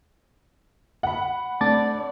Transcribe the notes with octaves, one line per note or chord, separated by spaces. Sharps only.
F#5 B5
A3 C4 D4 D5 A5 D6 A6